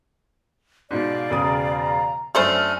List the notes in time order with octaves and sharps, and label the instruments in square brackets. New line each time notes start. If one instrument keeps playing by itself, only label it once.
[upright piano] G#2 B2 [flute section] D5 F5
[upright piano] E1 C#3 D#6 [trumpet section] A#5
[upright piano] F#2 D4 [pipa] A3 A4 C5 [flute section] G#5 F6